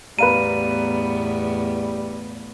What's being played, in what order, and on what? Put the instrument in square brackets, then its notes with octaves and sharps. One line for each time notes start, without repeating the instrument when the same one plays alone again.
[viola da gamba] E2 A2 B3 [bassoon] G3 [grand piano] B4 F5 A#5 [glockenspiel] D#7